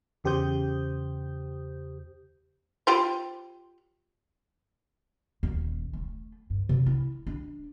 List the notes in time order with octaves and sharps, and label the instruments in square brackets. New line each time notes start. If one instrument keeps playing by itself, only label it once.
[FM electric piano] E2 C#3 G4 C5 D#6 G6
[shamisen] F4 G4 C5
[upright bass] D#1
A3
G2
C3
E4
D4